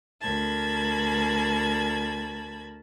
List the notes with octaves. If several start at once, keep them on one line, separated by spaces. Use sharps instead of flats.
D2 A#4 A5 B5 G#6